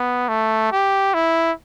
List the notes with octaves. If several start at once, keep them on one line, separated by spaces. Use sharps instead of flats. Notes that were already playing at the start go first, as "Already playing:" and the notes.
Already playing: B3
A3
G4
E4